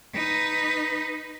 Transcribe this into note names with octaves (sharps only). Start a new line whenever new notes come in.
D#4 B4